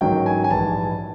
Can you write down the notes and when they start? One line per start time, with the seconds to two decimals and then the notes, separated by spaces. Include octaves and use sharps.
0.01 A1 G#2 D#3 F#3 G5
0.26 G#5
0.44 G#5
0.50 A#1 G#2 E3 G3 A5